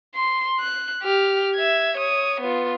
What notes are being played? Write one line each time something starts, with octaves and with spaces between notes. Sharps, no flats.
C6
F#6
G4 F6
E5 G#6
C#5 D#6
B3 F4